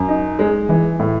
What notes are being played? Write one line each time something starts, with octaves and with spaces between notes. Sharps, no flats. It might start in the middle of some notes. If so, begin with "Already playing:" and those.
Already playing: F#2
D#4
G#3
E3
A2